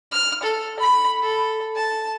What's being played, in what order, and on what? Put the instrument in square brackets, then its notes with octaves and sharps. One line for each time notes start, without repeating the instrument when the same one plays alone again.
[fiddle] F6
A4
B5
A4
A5